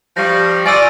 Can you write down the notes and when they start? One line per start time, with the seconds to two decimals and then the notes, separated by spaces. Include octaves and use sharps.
0.17 F3 G3 C#6 A#6
0.66 F4 D5 G#5 E6 A6 D7 D#7